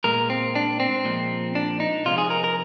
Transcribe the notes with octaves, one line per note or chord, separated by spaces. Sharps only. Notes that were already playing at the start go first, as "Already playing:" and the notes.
A#2 G#3 A#4
C4
D4
C4
A#2 F3 G#3
D4
D#4
C3 F3 G#3 F4
G#4
A#4
A#4